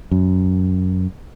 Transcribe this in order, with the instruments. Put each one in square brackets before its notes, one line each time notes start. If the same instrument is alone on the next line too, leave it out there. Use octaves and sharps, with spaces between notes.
[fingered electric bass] F#2